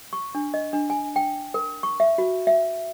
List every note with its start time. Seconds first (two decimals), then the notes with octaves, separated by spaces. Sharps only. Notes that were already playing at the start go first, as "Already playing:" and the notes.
0.13 C#6
0.35 D4
0.54 D#5
0.73 D4
0.90 G#5
1.16 G5
1.54 A#4
1.83 C#6
2.00 E5
2.18 F#4
2.47 E5